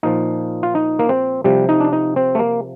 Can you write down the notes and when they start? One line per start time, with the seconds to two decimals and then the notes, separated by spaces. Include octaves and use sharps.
0.03 A#2 F3 D#4
0.63 F4
0.75 D#4
0.99 A#3
1.09 C4
1.44 C3 F3 G3
1.69 D#4
1.80 D4
1.93 D#4
2.16 C4
2.35 A3
2.39 A#3